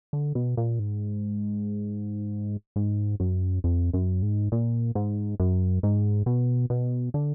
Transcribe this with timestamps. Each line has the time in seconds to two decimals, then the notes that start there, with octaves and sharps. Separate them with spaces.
0.13 D3
0.35 B2
0.57 A#2
0.79 G#2
2.76 G#2
3.20 F#2
3.64 F2
3.93 F#2
4.22 G#2
4.52 A#2
4.95 G#2
5.40 F#2
5.83 G#2
6.26 B2
6.70 B2
7.14 D3